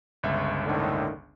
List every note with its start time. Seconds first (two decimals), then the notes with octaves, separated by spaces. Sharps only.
0.23 G1 C#2 E5
0.64 A2 D3 D#3